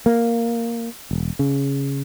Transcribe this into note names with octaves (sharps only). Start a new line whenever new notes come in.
A#3
E1
C#3